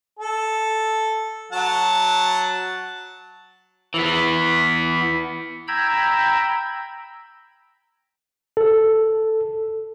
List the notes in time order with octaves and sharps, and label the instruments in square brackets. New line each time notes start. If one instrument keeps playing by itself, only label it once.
[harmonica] A4
F#3 F#5 A5
[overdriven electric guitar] E3 B3
[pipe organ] G5 A#5 B5 E6 G6 G#6
[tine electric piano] A4